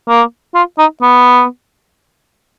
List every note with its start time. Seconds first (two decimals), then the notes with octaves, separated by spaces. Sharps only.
0.08 A#3
0.55 F4
0.78 D#4
1.02 B3